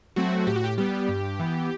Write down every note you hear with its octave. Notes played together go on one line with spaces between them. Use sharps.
F#3 A3 C4 F#4
A2 G4
F#4
G4
G3 B3 G4
G2
E3 B3